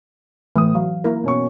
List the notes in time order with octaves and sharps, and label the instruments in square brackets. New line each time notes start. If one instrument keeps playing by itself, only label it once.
[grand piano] A2 D#6 [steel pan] E3
[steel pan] F#3 [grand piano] F5
[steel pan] A#3 E4 A#4
[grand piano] B2 C#4 C#6